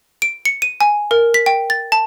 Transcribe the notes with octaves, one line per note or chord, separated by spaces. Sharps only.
D7
C#7
D#7
G#5
A#4
B6
G5
A6
A5